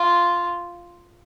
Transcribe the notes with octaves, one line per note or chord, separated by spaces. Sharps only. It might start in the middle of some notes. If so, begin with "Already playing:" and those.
Already playing: F4